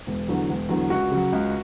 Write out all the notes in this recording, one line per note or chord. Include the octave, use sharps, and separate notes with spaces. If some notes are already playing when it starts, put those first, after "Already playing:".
E1
E2 D3 F#3
E1
E2 D3 F#3
C#2 F#4
C#3 F#3
C#2